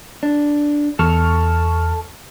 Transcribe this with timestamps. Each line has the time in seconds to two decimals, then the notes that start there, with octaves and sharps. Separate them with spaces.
0.23 D4
0.99 E2 A4 C#6 F6